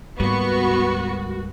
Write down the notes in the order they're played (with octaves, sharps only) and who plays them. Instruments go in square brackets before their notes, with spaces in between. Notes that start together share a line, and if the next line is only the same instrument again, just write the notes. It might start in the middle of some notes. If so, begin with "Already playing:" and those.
[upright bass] D2 G#2 [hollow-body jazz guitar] G3 A#3 [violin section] B3 C#6 [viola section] F#4